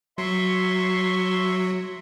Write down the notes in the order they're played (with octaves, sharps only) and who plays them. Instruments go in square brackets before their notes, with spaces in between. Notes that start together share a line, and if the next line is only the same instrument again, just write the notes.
[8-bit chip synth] F#3 [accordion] E5 C6 C#6